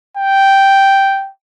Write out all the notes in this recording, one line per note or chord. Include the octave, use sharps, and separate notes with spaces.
G5